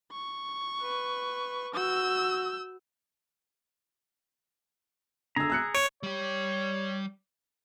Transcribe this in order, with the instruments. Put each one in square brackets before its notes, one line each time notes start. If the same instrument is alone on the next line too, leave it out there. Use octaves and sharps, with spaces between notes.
[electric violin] C#6
[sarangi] B4
[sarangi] F#4 [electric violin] E6 G6
[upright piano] D3 E6 [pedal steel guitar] G#4 A#5
[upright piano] E6 F#6 C#7
[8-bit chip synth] C#5 [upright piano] D7
[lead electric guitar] G3 G4 [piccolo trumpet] C#5